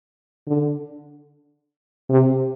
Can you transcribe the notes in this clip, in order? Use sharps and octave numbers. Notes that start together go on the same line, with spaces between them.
D3
C3